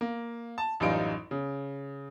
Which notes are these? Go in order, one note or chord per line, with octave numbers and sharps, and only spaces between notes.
A#3
A5
A1 F#2 G3 D#4 F4 D7
C#3